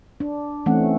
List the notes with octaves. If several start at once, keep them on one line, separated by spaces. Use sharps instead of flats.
D4
E3 A3 C4 C#4 F#5